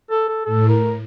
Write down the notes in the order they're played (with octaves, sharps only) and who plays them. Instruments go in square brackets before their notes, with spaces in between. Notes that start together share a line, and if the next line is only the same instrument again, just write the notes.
[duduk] A4
A4
[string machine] A2 [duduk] A4
[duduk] A#4